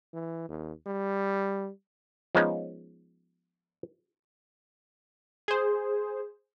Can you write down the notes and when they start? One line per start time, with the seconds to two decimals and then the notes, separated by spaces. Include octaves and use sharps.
0.14 E3
0.49 D#2
0.87 G3
2.35 F3 G#3 B3 C#4 D#4
5.48 G#4 C5